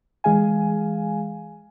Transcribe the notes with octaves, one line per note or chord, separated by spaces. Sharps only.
E3 G#3 G#4 F5 G#5